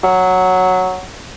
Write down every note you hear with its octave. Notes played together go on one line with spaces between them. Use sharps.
F#3